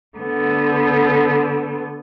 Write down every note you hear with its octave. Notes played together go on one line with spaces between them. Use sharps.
D3 B3